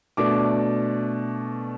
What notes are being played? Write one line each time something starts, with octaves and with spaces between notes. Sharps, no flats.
B2 A3 D4 D6